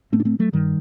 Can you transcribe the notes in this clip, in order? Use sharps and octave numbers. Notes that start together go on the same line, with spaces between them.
A2 A3 C4
D4
A3 C4
F#3 A3
G2 D#3 G3